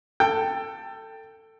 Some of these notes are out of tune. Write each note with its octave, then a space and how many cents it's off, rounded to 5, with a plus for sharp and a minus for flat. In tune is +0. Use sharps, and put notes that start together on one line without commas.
A4 +20 G5 +5